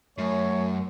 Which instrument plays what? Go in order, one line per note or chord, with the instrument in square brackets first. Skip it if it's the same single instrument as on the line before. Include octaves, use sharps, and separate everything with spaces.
[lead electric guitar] F#2 [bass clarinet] A3 [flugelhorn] C#5